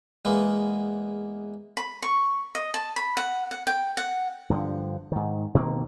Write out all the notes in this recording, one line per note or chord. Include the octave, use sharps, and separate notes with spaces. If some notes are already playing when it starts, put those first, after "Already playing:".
E2 G#3 A#3 B3
B5
C#6
D#5
A5
B5
F#5
F#5
G5
F#5
G2 D3 E3 F3
G#2 D#3
B2 D#3 A#3 C4